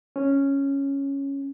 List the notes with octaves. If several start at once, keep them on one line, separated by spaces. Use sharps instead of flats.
C#4